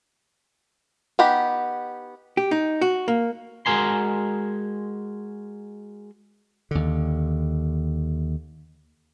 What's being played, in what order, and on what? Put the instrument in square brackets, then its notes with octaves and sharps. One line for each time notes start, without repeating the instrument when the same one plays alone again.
[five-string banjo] B3 D#4 G4 F#5 B5
[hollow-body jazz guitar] G4
D#4
F#4
A#3
[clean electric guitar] G#3 F#4 A#4 G#5 C6
[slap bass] D#2 D3